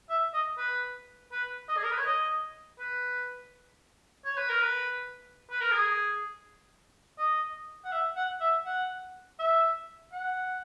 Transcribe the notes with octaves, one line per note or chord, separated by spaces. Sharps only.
E5
D#5
B4
B4
D#5
G#4
A#4
B4
C#5
D#5
B4
C#5
B4
A#4
B4
B4
A#4
G#4
D#5
F#5
E5
F#5
E5
F#5
E5
F#5